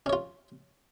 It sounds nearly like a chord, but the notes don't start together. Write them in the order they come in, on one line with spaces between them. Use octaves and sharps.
C#4 C#5 F4